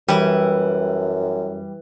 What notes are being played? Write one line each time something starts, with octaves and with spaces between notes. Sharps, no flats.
F#2 E3 G3 E4